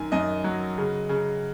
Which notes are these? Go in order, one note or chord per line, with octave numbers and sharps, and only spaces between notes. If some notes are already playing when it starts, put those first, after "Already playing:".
Already playing: F#2 D#3 G#5
F#2 D#5
F#3
C#3
C#3